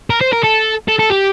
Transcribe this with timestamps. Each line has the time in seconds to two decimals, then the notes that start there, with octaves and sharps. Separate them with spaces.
0.10 A#4
0.21 C5
0.32 A#4
0.43 A4
0.88 A4
0.99 A4
1.10 G4